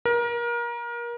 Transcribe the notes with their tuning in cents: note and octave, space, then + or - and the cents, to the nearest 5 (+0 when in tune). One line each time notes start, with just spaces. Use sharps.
A#4 +30